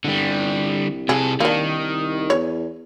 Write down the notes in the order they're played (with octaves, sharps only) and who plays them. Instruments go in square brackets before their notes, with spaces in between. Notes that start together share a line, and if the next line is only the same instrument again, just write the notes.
[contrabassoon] C2 [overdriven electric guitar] D3 G3
[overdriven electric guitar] C3 A4 [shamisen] G#4
[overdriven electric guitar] D#3 [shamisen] A#3 D4
[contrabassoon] E2 [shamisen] C#5